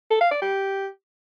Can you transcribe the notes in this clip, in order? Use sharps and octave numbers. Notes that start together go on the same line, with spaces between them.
A4
F5
D5
G4